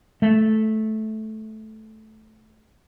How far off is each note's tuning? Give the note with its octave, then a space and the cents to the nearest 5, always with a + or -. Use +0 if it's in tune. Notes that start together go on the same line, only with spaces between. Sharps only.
A3 -10